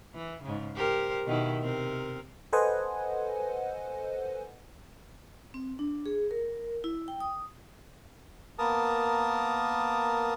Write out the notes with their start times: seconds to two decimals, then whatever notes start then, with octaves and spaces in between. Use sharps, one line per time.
0.15 E3
0.43 G#2 C#3
0.76 G4 A#4 C5
1.26 B2 D#3 E4
1.62 C3 C4 A#4
2.53 A4 B4 C5 D#5 F#5 G#5
5.54 C4
5.79 D4
6.06 G#4
6.31 A#4
6.84 E4
7.08 G5
7.20 D#6
8.59 A#3 B3 A#4 A5 D#6